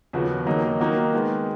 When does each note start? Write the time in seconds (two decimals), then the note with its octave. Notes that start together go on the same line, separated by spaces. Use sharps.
0.13 D#2 C#3 F3 B3 F#4
0.46 D#2 D#3 F#3 A#3 D#4
0.80 D#3 A#3 D#4 F#4
1.13 D#3 G#3 B3